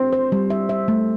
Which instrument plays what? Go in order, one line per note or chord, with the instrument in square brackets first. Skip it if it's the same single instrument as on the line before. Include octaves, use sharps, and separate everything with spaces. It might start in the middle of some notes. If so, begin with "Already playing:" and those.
Already playing: [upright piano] C4
[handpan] C5
G3
E5
E5
A3